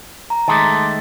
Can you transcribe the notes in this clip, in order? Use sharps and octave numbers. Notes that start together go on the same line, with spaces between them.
A#5
D#3 G#3 A3 A5 C6 D6